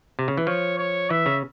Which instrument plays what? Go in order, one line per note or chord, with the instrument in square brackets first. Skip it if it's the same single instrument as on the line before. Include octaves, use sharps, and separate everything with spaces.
[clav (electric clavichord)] C3
C#3
E3
[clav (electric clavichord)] F3 [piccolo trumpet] C#5
[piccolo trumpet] C#5
[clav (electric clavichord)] E3 [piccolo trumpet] E5
[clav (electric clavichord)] C#3